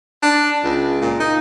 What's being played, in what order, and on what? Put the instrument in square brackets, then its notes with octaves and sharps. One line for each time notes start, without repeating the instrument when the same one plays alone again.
[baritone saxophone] D4
C#2
A#2
D#4